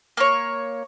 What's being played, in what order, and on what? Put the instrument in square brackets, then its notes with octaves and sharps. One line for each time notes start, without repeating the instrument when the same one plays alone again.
[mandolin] A#3 C#5